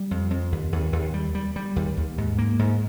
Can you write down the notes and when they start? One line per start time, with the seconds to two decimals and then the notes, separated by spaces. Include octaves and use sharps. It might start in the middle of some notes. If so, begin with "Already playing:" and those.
Already playing: G3
0.11 F2
0.31 F2
0.52 D#2
0.73 D#2
0.93 D#2
1.14 G3
1.35 G3
1.56 G3
1.76 D#2
1.97 D#2
2.18 G#2
2.38 A#3
2.59 G#2